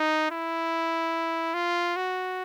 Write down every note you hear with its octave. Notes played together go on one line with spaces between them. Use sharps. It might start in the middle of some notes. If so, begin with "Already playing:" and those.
Already playing: D#4
E4
F4
F#4